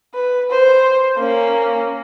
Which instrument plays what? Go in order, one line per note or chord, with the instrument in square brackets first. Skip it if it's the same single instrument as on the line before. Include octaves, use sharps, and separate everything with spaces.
[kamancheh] B4
C5
A#3 C#4